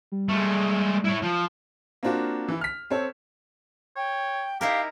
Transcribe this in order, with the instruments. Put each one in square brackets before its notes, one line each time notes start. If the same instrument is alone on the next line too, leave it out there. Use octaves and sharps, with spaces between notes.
[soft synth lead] G3
[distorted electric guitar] G#3 A3
E4 C#5
F3
[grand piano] A#3 C4 D4 F4 F#4
E3 E4
F6 B6
C4 A4 C#5
[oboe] C#5 [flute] G5
[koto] D#4 E4 A#4 [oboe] G4 [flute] F5